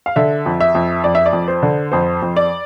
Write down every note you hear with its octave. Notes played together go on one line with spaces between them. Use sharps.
F5
D3 E5
F2
E5
F2
F2 D5
E5
D5
F2
C5
D3
F2 C5
F2
D5